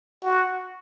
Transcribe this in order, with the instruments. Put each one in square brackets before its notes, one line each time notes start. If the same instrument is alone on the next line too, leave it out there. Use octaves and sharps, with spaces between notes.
[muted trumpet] F#4